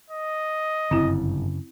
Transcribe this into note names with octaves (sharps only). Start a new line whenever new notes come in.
D#5
G1 F#2 C#3 C4 E4